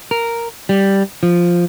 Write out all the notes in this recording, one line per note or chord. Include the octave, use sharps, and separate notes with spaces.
A#4
G3
F3